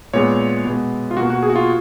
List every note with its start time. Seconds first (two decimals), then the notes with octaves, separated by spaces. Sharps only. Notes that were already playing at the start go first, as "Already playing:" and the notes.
0.13 A#2 G#3 B3 C#5
0.65 B2 G#3 B3
1.11 F4
1.17 B2 A#3 F#4
1.30 F#4
1.43 G#4
1.50 F#4
1.56 F4